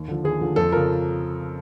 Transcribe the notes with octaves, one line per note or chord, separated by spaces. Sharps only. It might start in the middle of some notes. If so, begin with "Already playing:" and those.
Already playing: D#2
D3 F3
D#2 G#4
D3 F3
F2 A4
C#3 F3 A#4